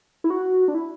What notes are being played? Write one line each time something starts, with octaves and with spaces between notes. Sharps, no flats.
E4
F#4
D4
E4